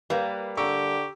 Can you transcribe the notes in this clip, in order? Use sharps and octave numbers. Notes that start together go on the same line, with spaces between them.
G3 A#3 B4 F5 A#5
D3 G4 A#5 C#6 E6